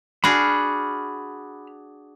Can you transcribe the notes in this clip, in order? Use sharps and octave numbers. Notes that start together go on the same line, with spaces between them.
D4 F#4 G#4 B5 F6